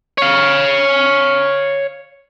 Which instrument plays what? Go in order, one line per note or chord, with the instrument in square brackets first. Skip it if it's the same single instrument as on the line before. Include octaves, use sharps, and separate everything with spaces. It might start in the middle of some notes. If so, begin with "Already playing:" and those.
[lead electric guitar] C#5 F5